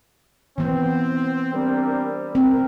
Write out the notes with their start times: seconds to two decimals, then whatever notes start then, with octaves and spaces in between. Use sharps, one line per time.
0.58 E3 B3 C4
1.54 G3 C4 D4 A#4
2.35 C4 A#4